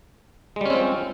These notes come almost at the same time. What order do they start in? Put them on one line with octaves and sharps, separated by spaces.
G#3 G3 C#4 C4 F4